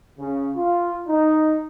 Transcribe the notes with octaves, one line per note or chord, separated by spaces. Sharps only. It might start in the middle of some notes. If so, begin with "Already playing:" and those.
C#3
F4
D#4